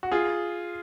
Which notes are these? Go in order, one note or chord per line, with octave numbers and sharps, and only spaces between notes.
F#4
F4 G#4